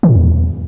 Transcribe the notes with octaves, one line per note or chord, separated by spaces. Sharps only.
D#3
A2
E2